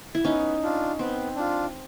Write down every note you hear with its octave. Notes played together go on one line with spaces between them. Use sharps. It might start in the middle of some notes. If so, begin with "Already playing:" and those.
E4
B3 C#4 D#4
D4 F4
B3 C4
D4 F4